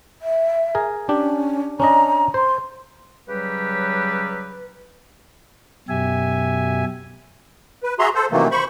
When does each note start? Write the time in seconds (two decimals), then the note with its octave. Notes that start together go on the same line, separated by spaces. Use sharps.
0.22 E5
0.75 G#4 A#4
1.09 C#4 D4 G4
1.80 C#4 D4 D#5 A#5
2.34 C5 C6
3.28 C#3 F#3 G3 G4 B4
5.89 F#2 B2 G4 E5 G#5
7.83 B4
7.99 F#4 G#4 E5 A#5 C6
8.15 A4 C5
8.32 C3 D#3 E3 F#3 A3 A#3
8.51 C5 B5 C#6